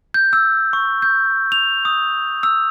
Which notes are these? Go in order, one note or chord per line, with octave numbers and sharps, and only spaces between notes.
G6
E6
C#6
G6
F7
D#6
E6